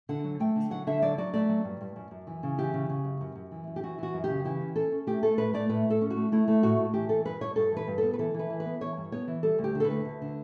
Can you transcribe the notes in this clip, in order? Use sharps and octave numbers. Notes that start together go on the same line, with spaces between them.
D3 F#5
F#3
A3 G5
D3
F#3 F#5
D3 E5
F#3 D5
F#3 D5
A3 D5
F#3
G2
G2
F#2
F#2
E3
C#3
E3 G4
C#3
C#3
F#2
F#2
F#2
E3
F#2
G4
E3 F#4
E3 F#4
F#2
G4
C#3
E3 G4
C#4
C#4 A4
C#4
A3 G4
A3 A4
A2 B4
A3 D5
A2 B4
A2
A4
C#4
F#4
A3
A3 E4
A3
A2 F#4
A2
E3 G4
E3 A4
G2 B4
G2 C#5
G2 A4
E3 B4
G2
A4
B3
B4
E3 A4
E3 B4
E3
B4
B3
E3 C#5
G2
B3 C#5
E3
G3 A4
D2
G4
D3
A4
B4
D2
D2
D3